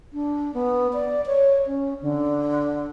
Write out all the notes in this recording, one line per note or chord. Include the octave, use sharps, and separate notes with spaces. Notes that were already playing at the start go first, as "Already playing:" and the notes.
D4
B3
D5
C#5
C#4
D3